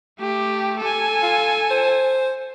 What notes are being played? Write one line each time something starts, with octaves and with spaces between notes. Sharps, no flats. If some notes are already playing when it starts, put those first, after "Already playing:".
A3 G4
A4 G#5
F4
C5